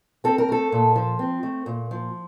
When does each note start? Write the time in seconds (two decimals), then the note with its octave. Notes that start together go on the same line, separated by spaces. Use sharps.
0.24 C4 A4
0.38 A#4
0.49 A3 A4
0.72 A#2
0.96 F3
1.19 C4
1.43 A3
1.66 A#2
1.91 F3